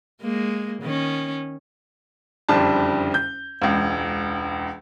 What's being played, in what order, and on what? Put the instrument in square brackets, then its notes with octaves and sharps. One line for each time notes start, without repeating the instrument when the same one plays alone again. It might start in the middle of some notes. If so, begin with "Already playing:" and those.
[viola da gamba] G#3 A#3
D#3 C#4
[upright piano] F#1 F2 D3 G3 A5
G6
E1 C#2